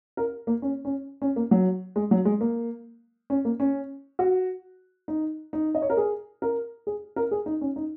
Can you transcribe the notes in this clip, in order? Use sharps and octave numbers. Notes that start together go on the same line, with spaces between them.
A#4
A#3
C#4
C#4
C#4
A#3
F#3
G#3
F#3
G#3
A#3
C#4
A#3
C#4
F#4
D#4
D#4
D#5
C#5
A#4
G#4
A#4
G#4
A#4
G#4
D#4
C#4
D#4